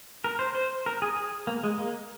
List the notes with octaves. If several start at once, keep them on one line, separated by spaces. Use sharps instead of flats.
A#4
C5
C5
A#4
G#4
G#4
A#3
G#3
A#3